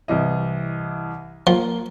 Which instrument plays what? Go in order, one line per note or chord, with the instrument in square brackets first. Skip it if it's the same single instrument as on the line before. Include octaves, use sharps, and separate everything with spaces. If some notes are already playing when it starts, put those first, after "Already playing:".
[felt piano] C2 E3 D#5
[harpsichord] F3 [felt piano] A#3